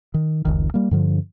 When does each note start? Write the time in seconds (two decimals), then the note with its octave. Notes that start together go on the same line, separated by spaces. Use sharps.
0.14 D#3
0.45 F1 C#2 D#3
0.74 G3 A#3
0.91 G2 D3 F3